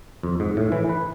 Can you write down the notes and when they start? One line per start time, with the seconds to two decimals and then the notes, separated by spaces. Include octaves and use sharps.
0.23 F2
0.40 G#2
0.57 A2
0.72 E3
0.89 B4